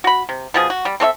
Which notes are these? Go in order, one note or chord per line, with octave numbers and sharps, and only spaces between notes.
F#4 B5
C3
B2 F3 G#4
F#4
G3
C4 A4 C#5 E5